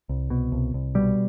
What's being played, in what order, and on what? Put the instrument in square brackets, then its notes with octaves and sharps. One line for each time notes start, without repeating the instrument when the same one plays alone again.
[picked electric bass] C2
B2
C2
C2
B2 G3